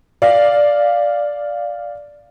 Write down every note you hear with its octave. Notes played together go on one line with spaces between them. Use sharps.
D5 F5